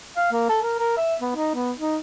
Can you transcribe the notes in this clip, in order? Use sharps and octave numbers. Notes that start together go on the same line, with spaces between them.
F5
A#3
A4
A#4
A#4
E5
B3
D#4
B3
D#4